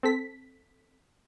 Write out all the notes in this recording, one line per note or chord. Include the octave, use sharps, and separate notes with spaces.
C4 A4 B6